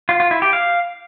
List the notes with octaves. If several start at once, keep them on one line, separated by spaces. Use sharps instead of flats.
F4
F4
E4
G4
F5